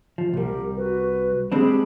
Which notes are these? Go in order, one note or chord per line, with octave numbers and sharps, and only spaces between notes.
F3
C2 G3 G4 A#4
F#4 B4
G#3 C4 D4 G4 G#4 B5